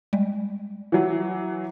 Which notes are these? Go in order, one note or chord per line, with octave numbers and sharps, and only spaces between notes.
G3 G#3
E3 F#3